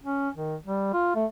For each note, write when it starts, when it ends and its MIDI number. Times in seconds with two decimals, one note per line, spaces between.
0.04 0.29 61
0.35 0.55 51
0.66 0.89 55
0.93 1.12 65
1.15 1.26 57